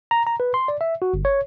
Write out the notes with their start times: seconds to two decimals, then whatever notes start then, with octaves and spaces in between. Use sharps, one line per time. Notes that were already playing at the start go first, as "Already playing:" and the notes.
0.11 A#5
0.27 A#5
0.40 B4
0.54 C6
0.68 D5
0.81 E5
1.02 F#4
1.14 G1
1.25 C#5